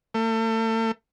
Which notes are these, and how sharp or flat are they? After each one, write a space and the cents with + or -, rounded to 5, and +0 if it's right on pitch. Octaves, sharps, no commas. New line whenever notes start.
A3 +35